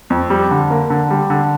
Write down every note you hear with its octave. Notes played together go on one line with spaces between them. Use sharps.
F2
G3
D3
A#3
D3
G3
D3